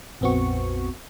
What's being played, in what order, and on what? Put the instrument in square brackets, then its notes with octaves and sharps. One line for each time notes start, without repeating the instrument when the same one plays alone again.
[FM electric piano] A#1 F2 B3 C4 F#4 C#6